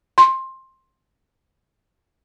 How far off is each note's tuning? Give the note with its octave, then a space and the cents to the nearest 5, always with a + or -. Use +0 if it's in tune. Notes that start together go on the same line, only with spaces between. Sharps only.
C6 +15